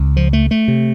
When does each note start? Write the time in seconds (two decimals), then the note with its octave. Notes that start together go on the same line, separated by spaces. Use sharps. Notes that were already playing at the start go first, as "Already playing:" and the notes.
Already playing: C#2 C#3
0.17 F3
0.33 A3
0.51 A3
0.68 C3